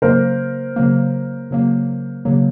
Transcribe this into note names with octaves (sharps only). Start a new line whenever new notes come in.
C#3 F#3 A#3 A#4 C5
C#3 F#3 A#3
C#3 F#3 A#3
C#3 F#3 A#3